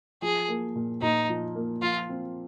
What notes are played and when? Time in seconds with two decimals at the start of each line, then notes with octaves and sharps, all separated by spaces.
0.22 F3 G#4
0.49 A#3
0.76 A#2
1.02 A#2 D#4
1.29 F3
1.55 A#3
1.82 F3 F4
2.09 C4